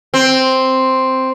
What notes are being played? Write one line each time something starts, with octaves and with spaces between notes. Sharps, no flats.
C4